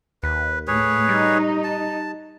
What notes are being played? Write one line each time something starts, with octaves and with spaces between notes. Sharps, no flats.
D#2 B4
A2 A3 G#4 B4 C#5
G3 D#4
A5